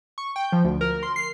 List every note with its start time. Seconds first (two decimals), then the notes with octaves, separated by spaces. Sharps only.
0.18 C#6
0.36 G5
0.52 F3
0.64 D2
0.81 A#4
1.03 C6
1.16 C7